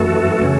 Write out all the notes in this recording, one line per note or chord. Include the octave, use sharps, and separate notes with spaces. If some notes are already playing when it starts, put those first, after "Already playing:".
Already playing: F#2 E3 A3 F#4 A4
C#3 A3 C#4